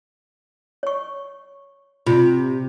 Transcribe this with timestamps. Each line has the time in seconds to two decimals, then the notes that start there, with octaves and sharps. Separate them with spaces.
0.83 C#5 C#6
2.07 C3 F4